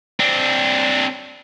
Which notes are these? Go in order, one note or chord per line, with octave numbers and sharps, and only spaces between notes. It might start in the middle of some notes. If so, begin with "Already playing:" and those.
C4 D4